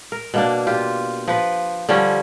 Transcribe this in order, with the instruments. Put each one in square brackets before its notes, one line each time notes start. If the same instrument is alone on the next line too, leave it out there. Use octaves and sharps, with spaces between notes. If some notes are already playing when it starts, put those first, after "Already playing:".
[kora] A#4
B2 A#3 D4
F4 G4
F3 B4
D3 F3 G3 C#4